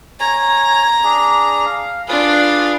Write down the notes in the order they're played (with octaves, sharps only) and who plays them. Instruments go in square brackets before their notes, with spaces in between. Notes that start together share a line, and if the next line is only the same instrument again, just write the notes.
[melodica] C#5 G#5 [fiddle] A#5
[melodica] D4 G#4
F5
[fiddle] D4 F4 [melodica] G#4 B4